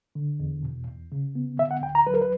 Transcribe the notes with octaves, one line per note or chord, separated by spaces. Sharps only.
D3
E2
B2
E2
C#3
B3
D3 E5
F#5
D2 G5
A#5
F#3 B4
A#4
B4